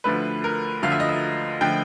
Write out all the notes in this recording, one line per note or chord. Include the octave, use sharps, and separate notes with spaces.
D2 D3 F3 A3 B4
A#4
D2 D3 F3 A3 F5
E5
D#5
E5
D3 F3 A3 G5